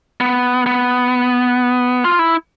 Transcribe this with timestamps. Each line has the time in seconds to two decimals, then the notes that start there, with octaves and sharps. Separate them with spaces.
0.21 B3
0.66 B3
2.05 F4
2.19 E4